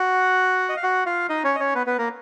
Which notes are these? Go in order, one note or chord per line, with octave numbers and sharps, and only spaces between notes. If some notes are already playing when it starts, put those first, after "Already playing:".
Already playing: F#4 F#5
D#5
F5
F#4 F#5
F4 F5
D#4 D#5
C#4 C#5
D#5
C#4 C#5
B3 B4
B3 B4
A#3 A#4